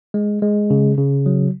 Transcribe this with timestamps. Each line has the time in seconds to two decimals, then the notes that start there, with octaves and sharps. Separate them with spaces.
0.14 G#3
0.42 G#3
0.70 C#3
0.98 C#3
1.26 F#3